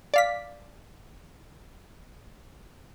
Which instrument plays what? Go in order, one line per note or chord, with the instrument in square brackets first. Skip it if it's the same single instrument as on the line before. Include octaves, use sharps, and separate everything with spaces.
[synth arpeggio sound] D5 F5 B6